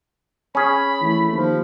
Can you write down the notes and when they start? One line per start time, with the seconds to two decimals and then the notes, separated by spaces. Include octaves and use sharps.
0.55 C#4 G#4 B5
1.02 E3 A3
1.33 D#2 F3